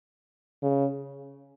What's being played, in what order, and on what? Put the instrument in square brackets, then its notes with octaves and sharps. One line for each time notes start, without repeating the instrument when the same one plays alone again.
[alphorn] C#3